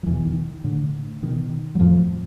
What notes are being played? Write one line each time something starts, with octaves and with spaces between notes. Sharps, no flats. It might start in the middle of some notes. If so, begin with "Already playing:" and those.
F3
E2 B2 E3
D#3
A2 D3
B2 D#3
F#3
F2 A2 F3